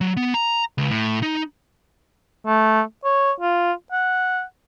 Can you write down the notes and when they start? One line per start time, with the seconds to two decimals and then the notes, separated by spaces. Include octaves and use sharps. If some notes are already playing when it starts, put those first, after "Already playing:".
0.01 F#3
0.17 B3
0.34 A#5
0.78 C#2
0.90 A2
1.23 D#4
2.46 A3
3.04 C#5
3.41 F4
3.92 F#5